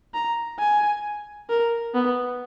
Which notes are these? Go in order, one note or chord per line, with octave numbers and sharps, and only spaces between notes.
A#5
G#5
A#4
B3